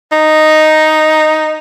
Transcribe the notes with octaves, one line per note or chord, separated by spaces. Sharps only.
D#4